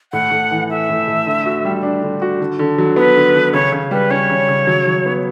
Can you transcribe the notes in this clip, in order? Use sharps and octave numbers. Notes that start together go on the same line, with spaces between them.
A2 F#5
A2
E3
A3 E5
A2
A2
D3
F#4
G3
D4
D3
F#4
D3
D3
F#3
B3 B4
D3
D3
C#3 C#5
C#3
G3 B4
C#4 C#5
C#3
C#3
F#3
F#3
B3